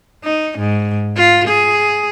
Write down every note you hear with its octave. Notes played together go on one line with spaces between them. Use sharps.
D#4
G#2
F4
G#4